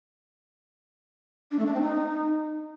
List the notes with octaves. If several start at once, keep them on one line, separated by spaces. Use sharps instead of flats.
D4
A3
D4
C4
D#4